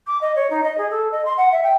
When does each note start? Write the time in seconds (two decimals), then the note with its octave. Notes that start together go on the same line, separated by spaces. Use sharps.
0.07 D6
0.21 D#5
0.35 C#5
0.50 D#4
0.64 D#5
0.78 G#4
0.90 A4
1.12 D#5
1.25 C6
1.37 F#5
1.52 E5
1.63 G5